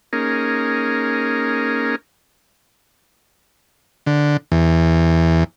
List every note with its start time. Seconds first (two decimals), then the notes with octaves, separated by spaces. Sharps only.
0.13 A#3 C#4 D#4 G#4 A#4
4.07 D3
4.52 E2